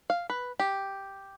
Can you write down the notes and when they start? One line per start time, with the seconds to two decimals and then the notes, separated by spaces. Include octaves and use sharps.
0.10 F5
0.30 B4
0.60 G4